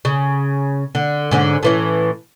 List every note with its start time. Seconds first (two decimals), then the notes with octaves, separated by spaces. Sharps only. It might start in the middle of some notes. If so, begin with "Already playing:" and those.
0.05 C#3
0.95 D3
1.31 G#2 D3 C#4
1.63 A2 E3 C#4